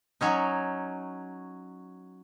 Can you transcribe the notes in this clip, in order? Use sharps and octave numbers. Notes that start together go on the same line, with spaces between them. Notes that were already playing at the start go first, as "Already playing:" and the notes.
F#3 C#4 D#4